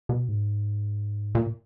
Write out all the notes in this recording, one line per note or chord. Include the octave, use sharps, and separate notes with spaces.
B2
G#2
A#2